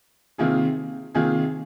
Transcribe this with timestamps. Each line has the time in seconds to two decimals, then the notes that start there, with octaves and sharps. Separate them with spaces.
0.38 C3 D#3 A#3 F4 G#4
1.15 C3 D#3 A#3 F4 G#4